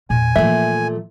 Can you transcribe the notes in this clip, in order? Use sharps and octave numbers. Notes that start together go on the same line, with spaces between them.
E2 A#2 G#5
A#2 E3 F3 A3 E5